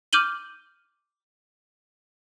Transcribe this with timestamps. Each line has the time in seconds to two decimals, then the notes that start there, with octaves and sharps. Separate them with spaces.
0.13 D6 F6 G6 D#7 F#7 G7